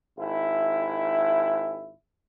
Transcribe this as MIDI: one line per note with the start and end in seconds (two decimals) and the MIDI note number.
0.18 1.91 32
0.18 1.91 64